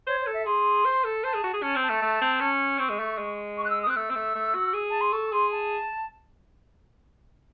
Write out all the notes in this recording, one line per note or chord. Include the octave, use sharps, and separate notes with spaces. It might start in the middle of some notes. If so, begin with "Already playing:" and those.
C5 C#5
C#5
A4
E5
G#4 C6
C5
A4
C5 A5
G#4
F#4
G#4
C#4 A5
C4
A5
A3
A3
C4
C#4
C4 C#6
G#3
A3
G#3
C#6
F#6
E6
D#6
C4 F#6
A3 E6
C4
A3
A3
F#4
G#4
A5
C6
A4 C#6
G#4 C6
A5